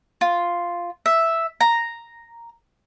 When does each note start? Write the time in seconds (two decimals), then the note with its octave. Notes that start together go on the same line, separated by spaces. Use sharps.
0.21 F4
1.06 E5
1.61 A#5